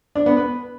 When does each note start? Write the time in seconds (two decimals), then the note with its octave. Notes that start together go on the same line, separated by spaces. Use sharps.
0.16 D4
0.26 B3
0.37 B4